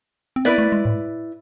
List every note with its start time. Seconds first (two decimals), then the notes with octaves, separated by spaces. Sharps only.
0.36 C4
0.45 B3 E4 B4 D5
0.58 A3
0.72 G#3
0.85 A2